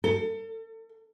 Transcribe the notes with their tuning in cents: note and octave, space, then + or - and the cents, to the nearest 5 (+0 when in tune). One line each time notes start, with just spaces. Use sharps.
A4 +35